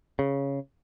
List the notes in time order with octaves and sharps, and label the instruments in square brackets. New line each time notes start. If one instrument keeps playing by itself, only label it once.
[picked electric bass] C#3